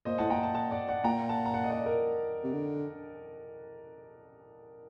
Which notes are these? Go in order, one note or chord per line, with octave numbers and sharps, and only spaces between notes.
A#2 C5 D#5
A2 F#5 A5
A#2 G5 A#5
F#5 A5
F#5 A5
D5 F#5
D5 F#5
A#2 G5 A#5
F#5 A5
A#5
F#5 A5
D#5
D5 F#5
A#4
C3
D3